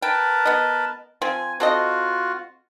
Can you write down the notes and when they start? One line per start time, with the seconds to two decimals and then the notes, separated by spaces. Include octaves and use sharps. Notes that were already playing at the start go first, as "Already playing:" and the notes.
0.02 A#4 B4 G5 A5
0.45 B3 D#5
1.22 F3 C4 G#5
1.60 C4 F4 F#4 A4 D#5